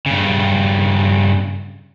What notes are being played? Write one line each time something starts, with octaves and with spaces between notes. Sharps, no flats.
G2 C#3